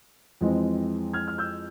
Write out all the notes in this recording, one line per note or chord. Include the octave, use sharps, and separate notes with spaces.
F2 E3 G#3 C4
F6 G#6
F6
E6 G6